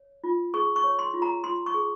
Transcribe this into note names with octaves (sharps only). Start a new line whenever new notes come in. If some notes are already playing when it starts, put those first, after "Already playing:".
Already playing: C#5
F4
G#4 C#6
C#6
C#5
C6
F4
A#5
F4 C6
C#6
G#4